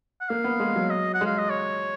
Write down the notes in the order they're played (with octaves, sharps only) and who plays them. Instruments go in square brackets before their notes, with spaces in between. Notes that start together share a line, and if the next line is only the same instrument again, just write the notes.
[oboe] F#5
[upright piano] A#3 [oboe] F5
[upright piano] B3
G#3
F#3
[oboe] D#5
F#5
[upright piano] G#3
[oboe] F5
D#5
C#5